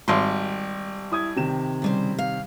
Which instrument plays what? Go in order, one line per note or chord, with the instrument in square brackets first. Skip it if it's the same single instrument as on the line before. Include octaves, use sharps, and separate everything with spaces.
[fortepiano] G#1 C6 [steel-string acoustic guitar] G3 G4
[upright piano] E4 D#6 G#6
C3 D#3 E7
[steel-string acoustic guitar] C#3 G3 C5
F5